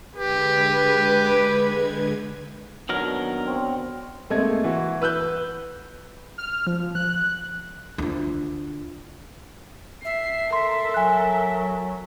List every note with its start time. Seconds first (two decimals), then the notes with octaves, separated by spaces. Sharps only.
0.16 D3 G#3 G4 B4 G#6
2.89 B2 D3 D#3 F#3 A#4
3.47 C4 C#5
4.30 G#2 A3 A#3 C4 D#5 G#6
4.64 E3 F#4
5.02 B4 E6 F#6 G6
6.38 F6
6.67 F3
6.95 F#6
7.98 D2 F4
10.05 E5 C7
10.53 A4 A#4 C6
10.94 F#3 G#5 F#6